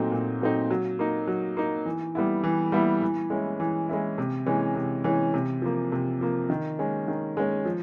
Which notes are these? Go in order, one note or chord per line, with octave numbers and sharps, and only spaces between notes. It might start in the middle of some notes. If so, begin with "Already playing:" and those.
Already playing: A#2 F#3 A3 C4 D#4
A#2
F#3 A3 C4 D#4
F#3
A#3 D#4
F#3
A#3 D#4
E3
G3 B3 E4
E3
G3 B3 E4
E3
G#3 C#4 E4
E3
G#3 C#4 E4
C3
E3 G#3 C#4
C3
E3 G#3 C#4
C3
F3 A#3
C3
F3 A#3
D#3
G#3 C#4
D#3
G#3 C#4
F3